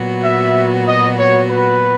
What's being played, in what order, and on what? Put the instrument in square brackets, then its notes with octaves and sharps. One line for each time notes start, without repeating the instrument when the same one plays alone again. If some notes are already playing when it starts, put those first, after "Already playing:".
Already playing: [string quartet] A#2 F#3 B3 F#4
[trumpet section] E5
D#5
C#5
B4